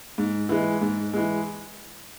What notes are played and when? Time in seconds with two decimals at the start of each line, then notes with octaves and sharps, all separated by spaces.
0.18 G#2
0.49 E3 G#3
0.81 G#2
1.13 E3 G#3